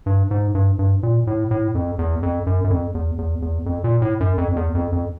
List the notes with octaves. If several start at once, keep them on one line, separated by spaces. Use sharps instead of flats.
G2
G#2
G2
G2
A#2
A2
A2
F2
E2
F2
F#2
F#2
F2
E2
E2
E2
F2
A#2
A2
F#2
F2
F2
E2
F2
F2